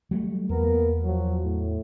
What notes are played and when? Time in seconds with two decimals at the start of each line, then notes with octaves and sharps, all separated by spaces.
0.11 F#3 G3 A3
0.49 E2 A#3 B3 A#4
1.04 F3 F#3
1.44 A2